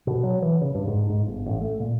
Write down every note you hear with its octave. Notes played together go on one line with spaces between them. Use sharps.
B2
F#3
E3
C#3
G2
G#2
G#2
G1
A1
A3
A#2